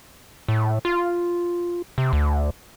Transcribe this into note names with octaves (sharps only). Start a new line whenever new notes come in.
A2
F4
C3
D2